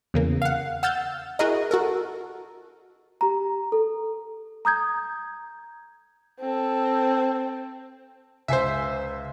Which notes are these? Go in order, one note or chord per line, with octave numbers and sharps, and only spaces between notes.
E2 C#3 A#3
F5 F#5
F#5 E6 F6 G6 A6
E4 F#4 G#4 A#4 D#5
F#4 A4 A#4
G4 A#5
A4
A#5 D#6 G6 G#6
C4 A4
C#2 C5 E5 G#5 C7